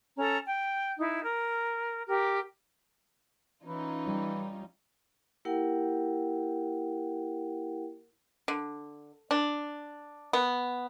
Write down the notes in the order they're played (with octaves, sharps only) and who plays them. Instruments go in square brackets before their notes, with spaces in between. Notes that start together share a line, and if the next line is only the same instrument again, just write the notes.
[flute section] C#4 A4 A#5
G5
D#4 E4
A#4
G4 A#4
[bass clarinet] E3 [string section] C#4 D#4 F4
[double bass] G3
[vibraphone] A#3 E4 G4 A#4 F#5 G5
[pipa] D3
D4
B3